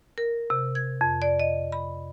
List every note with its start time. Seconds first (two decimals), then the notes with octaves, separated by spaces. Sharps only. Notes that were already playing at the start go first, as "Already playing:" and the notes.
0.18 A#4
0.50 C3
0.75 G#6
1.01 F2
1.22 D5
1.40 D#5
1.72 B5